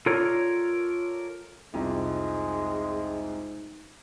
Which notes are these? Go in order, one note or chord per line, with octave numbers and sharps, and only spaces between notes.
F4 A4 A#4 C#5 D5
C2 F2 G#2 G#3